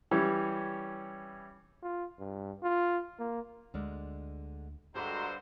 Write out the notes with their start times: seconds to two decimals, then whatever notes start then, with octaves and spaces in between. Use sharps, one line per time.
0.11 E3 G3 C#4 C#5
1.82 F4
2.19 G2
2.63 F4
3.19 A#3
3.74 D2 D3 G#3 D5
4.95 G2 D3 G#3 F#4 G#4 A4 C5 A#5